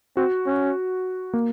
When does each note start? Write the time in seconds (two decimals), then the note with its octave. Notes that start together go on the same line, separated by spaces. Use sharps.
0.17 C4 F#4
0.46 C#4
1.34 A#3